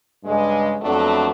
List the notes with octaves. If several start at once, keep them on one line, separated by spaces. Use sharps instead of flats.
G2 C#3 G#3
F2 F#3 A3 B3 D4